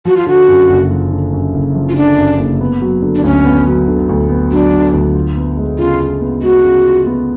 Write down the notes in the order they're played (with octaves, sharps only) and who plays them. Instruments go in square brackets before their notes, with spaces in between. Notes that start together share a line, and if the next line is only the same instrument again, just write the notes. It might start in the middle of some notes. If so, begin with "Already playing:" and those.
[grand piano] F3 [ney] F#4
[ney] F4
[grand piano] D3 [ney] F#4
[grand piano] F#2
F#1
F3
D3
F#2
F#1
F3
[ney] F4
[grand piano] D3 [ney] D4
[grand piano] F#2
F#1
B3
F#3
D3
[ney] D4
[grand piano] D2 [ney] C#4
[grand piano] B3
F#3
D3
D2
B3
[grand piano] F#3 [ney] D4
[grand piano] D3
D2
F4
B3
G#3
[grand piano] C#3 [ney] F4
[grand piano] F4
B3
[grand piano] G#3 [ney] F#4
[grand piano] C#3
F4
B3